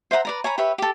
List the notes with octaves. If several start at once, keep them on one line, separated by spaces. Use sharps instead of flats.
C5 E5 F#5 A#5
B4 D5 A#5
C#5 G#5 A#5 B5
G4 B4 C#5 E5
G4 A4